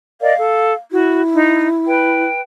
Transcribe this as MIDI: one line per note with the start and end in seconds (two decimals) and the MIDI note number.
0.21 0.33 70
0.21 0.33 74
0.21 0.33 75
0.21 0.72 77
0.38 0.71 69
0.91 2.24 64
0.91 1.21 66
1.35 1.67 63
1.87 2.42 71
1.87 2.42 79